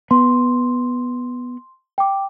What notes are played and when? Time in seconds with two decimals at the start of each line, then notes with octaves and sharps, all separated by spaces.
0.11 B3 C6
1.98 G5 D6